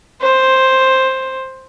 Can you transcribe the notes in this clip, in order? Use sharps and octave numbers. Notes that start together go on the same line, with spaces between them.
C5